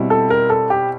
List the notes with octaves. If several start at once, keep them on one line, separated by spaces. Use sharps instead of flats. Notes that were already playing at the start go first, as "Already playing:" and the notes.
Already playing: B2 G3 C4 E4
A4
A#4
A4
G4